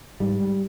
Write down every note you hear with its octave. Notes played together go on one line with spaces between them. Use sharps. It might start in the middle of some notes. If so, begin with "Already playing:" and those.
G#2 G3